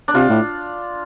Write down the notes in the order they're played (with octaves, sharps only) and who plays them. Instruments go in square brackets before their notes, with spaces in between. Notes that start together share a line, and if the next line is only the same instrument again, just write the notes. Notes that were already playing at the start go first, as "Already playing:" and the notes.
[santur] D4
[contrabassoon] C3 [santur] F4
[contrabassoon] A2